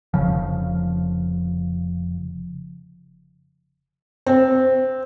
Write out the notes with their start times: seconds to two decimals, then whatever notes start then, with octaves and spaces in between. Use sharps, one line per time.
0.14 F1 D#2 C#3 F3
4.26 C4